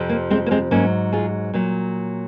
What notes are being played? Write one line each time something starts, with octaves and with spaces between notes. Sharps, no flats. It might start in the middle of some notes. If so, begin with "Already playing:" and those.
Already playing: F2 C3 F3
A#3
G#3 C4
A#3
G#3 C4
G#2 F#3 A#3 C#4
F4 G#4
A#2 F#3